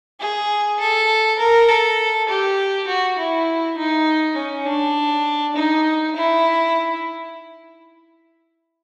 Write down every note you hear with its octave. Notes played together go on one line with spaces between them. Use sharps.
G#4
A4
A#4
A4
G4
F#4
E4
D#4
C#4
D4
D#4
E4